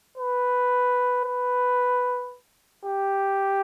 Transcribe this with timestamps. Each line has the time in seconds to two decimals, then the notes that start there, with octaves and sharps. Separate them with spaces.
0.18 B4
1.25 B4
2.85 G4